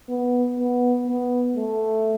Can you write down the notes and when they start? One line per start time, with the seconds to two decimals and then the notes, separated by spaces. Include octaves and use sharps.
0.09 B3
0.59 B3
1.07 B3
1.56 A3